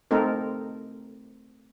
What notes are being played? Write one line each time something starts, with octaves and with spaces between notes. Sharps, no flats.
A3 C4 D#4 A4 A#4